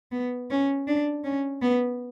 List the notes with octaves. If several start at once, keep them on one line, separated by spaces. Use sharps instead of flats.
B3
C#4
D4
C#4
B3